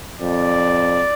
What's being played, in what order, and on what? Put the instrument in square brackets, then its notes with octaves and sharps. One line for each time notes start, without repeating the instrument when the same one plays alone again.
[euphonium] F2 [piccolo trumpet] D5